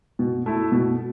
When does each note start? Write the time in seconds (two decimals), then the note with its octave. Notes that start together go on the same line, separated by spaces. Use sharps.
0.19 B2
0.46 A3 E4
0.72 B2